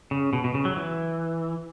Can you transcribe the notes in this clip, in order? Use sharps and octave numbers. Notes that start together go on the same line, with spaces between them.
C#3
B2
B2
C#3
F#3
E3